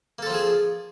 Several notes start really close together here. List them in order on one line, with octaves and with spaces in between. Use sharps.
A#3 A4 C4 F3 G#4